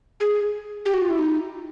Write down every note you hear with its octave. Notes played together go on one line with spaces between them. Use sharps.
G#4
G4
F#4
F4
E4
D#4